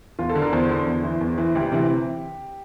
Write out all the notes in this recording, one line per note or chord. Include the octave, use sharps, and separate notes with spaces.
E2 F4
A4
D3
A#4
E2 C5
D3
E2
E3
E2
E3
D2 G4
C3 E3